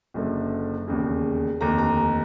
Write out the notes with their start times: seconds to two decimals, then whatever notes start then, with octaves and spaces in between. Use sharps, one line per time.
0.14 F#1 F#2 D3
0.88 E1 D#2 C#3
1.61 F1 D#2 D3 A#5
1.78 A#5
1.97 A#5